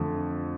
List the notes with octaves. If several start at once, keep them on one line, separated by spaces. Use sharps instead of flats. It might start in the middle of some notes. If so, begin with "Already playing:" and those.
Already playing: F2 D3 A3